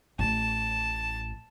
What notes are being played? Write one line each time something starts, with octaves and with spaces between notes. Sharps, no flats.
A1 A2 A5